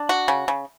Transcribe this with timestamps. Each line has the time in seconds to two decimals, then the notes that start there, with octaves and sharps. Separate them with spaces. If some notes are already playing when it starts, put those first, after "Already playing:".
Already playing: D4
0.09 F#4
0.28 C#3
0.48 C#3